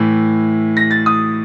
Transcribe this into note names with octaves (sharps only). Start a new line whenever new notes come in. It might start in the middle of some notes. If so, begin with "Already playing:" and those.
Already playing: A2 E3
A#6
A6
D#6